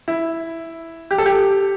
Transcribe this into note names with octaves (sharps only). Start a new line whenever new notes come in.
E4
G4
A4
G4